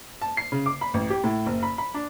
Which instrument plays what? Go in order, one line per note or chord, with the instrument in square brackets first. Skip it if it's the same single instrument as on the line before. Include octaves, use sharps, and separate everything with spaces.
[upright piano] A5
C7
C#3
D6
B5
A1
G4
A2
F#1
B5
B5
D4